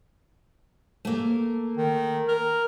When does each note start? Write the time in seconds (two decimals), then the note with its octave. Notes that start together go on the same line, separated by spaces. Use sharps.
1.05 A3 A#3
1.77 D#3
2.28 A#4